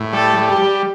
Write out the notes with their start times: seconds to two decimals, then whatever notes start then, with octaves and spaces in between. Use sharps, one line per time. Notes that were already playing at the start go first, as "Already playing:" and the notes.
Already playing: A2
0.13 G3 A4
0.37 G3
0.49 G4
0.62 G3